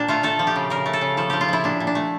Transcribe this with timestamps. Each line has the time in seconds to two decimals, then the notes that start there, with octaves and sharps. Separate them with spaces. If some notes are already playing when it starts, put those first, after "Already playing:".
Already playing: A#2 D4
0.08 A3 F4
0.23 A3 A4
0.39 F3
0.47 G4
0.56 C#3
0.70 C#3 A#4
0.86 A3
0.93 A4
1.01 C#3
1.17 F3 A4
1.30 F3 G4
1.41 F4
1.48 F3 E4
1.64 A#2 D4
1.80 A#2
1.87 D4
1.95 A3